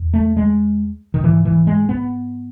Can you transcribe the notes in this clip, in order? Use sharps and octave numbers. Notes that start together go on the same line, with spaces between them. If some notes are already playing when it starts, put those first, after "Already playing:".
Already playing: E2
A3
G#3
D#3
G#2 E3
E3
G#3
B3